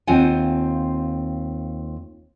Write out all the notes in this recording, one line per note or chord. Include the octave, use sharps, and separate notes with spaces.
D#2 C4 F4 F#5 G#5